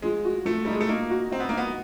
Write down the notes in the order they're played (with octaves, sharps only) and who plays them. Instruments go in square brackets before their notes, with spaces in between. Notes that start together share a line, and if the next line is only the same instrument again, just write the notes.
[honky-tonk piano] F3 [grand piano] G#3
[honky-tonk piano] F#4
[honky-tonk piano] F3 [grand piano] A3
[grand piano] G3 [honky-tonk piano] D#4
[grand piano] G#3
A3
[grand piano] A#3 [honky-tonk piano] D#4
[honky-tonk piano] F#4
[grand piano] C4 [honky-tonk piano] D#4
[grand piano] B3
A#3
[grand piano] B3 [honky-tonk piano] D#4